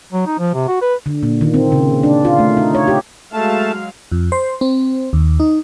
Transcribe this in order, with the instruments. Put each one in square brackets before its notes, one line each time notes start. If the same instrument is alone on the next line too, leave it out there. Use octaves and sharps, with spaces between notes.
[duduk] F#3
D#4
F3
C3
F#4
B4
[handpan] D3
A#2
D#3
C4
C#3
D4
F4
A3
D#4
C#5
G4
[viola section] F#3 G#3 F5 [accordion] A3 A5
[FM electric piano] F2
C5
C4
D#2
D#4